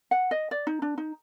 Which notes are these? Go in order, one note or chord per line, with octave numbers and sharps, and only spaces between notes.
F#5
D#5
D5
D#4
D4
D#4